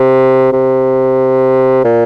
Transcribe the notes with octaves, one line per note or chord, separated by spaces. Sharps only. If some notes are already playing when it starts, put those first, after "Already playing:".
Already playing: C3
C3
A#2